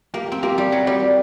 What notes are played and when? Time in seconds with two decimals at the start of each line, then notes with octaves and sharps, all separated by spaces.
0.14 A#3 G4
0.29 C4 G4
0.43 A#3 G4
0.58 G3 G4
0.72 F#3 G4
0.87 G3 D5
1.02 G4